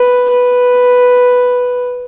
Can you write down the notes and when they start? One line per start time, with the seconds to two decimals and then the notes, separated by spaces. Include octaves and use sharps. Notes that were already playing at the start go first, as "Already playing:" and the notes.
Already playing: B4
0.30 B4